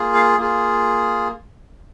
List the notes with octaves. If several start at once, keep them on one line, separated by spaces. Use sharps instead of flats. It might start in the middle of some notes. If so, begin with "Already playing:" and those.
Already playing: A#3 F4 G#4
F5
A#3 F4 G#4